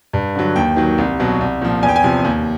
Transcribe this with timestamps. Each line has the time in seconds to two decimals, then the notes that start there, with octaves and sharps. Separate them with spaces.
0.13 G2
0.35 D3 F#3
0.56 D#2 G5
0.76 D#3 F#3
0.98 C2
1.20 B2 F#3
1.41 C2
1.62 A#2 F3
1.83 E2 G#5
1.89 G5
1.96 G#5
2.04 C3 F3
2.24 D#2